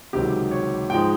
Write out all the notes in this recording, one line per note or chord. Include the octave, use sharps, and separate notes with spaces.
C#2 C3 D#3 F#3 G4
C#5
G#2 F3 G#3 G5